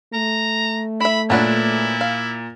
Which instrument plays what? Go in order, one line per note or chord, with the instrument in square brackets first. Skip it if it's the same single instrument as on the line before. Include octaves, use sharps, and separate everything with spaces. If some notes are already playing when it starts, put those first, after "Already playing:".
[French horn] A3 [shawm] A#5
[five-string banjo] E4 E5 [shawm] B5
[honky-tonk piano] A#2 [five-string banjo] F#3 B3 D4 [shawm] E4
[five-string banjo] F5